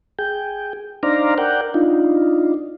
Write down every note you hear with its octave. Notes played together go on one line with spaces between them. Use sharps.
G#4 G5
D4 D#4 C5 D5 F5 A#5
A#4 D5 F#5 G5
D4 D#4 F4